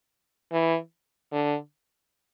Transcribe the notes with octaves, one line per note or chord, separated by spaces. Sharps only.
E3
D3